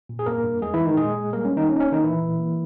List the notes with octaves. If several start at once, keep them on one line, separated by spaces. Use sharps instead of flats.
A#2
G#4
G2 A#3 A#4
G2
E2 G#3 G#4
E3 E4
G#3
D#3 D#4
A#2 G#3 G#4
G#3
G3 A#3 A#4
C#4
A#3
D#3 D#4
A#3 C#4
D#4
C#4
A#3
D#3 D#4
A#2 E3 E4
A#2
A#3